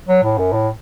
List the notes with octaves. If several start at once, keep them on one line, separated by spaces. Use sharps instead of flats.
F#3
A2
F#2
A2